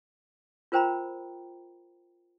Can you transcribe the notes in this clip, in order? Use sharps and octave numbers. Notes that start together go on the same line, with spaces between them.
F4 A#4 C5 G5 A#5 B5